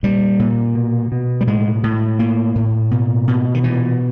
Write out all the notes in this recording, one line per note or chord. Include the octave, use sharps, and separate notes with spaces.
A#2 G3
A#2
B2
B2
G3
A2 G#3
A2
A2 A#3
A2
B2
B2
D#3
A#2 E3